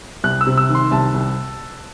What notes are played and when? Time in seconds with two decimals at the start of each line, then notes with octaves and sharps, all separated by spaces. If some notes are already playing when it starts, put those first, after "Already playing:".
0.24 C2 F#6
0.41 E6
0.46 C3
0.58 E6
0.69 D#3
0.75 C6
0.91 C2 A5
1.14 C2